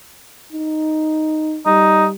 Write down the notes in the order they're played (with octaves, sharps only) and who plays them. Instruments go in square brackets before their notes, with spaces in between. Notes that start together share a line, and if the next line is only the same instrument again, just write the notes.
[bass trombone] D#4
[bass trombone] G3 [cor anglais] D#4